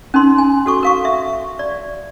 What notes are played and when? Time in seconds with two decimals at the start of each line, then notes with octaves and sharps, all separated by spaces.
0.14 C#4 D#4 A#4 C6
0.38 G#5
0.66 F#4 A4 C#6
0.83 A#4 F5 C#6
1.05 E5
1.59 D5